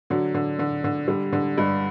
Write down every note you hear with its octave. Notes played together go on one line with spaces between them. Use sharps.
D3 F#3
D3
D3
D3
D3 G3
D3
G2